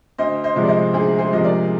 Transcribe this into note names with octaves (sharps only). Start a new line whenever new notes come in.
D2 C5 D#5
C5 D#5
C3 F3 G#3
D5
C5 D#5
D2 G#4 C5
G#4 C5
C3 F3 G#3 D#5
A#4 D5